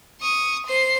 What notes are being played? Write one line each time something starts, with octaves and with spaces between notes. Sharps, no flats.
C#6 D#6
C5 C7